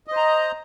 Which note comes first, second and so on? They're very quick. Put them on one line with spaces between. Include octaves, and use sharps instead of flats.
D#5 C5 A#5